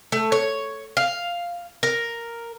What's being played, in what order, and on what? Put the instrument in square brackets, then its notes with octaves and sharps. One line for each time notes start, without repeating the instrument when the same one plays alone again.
[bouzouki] A3
C#5
F5
A#4